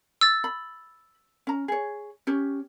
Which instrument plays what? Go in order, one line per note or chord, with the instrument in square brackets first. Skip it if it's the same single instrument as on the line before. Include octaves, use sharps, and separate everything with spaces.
[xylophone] E6 A6
[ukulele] B5
C#4 A#5
G#4 C#5
C#4 G4 C#5